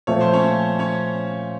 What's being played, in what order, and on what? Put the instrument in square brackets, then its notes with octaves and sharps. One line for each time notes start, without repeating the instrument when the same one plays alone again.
[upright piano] A#2 F3 A3 [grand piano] C#5
[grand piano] C5
C#4 C#5
C#4 C#5